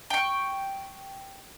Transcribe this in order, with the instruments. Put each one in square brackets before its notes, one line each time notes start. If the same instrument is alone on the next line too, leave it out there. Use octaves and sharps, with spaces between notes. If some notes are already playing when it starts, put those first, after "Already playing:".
[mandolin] G5 C#6